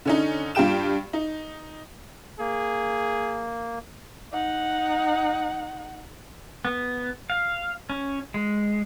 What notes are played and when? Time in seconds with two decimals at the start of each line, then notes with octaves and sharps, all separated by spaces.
0.05 D3 C#4 D#4
0.55 G2 F4 G4 G5 E7
1.13 D#4
2.39 A#3 G#4
4.33 D#4 F#5
6.65 B3
7.30 F5
7.90 C#4
8.34 G#3